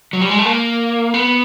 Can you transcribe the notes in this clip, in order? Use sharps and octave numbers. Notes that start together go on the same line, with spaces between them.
F#3
G3
G#3
A3
A#3
B3